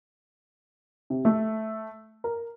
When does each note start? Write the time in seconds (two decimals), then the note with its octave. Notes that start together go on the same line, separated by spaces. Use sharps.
1.10 C3
1.25 A3
2.24 A#4